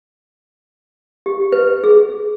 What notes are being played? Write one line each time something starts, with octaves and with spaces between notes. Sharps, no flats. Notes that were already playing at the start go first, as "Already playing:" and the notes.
G4
B4
G#4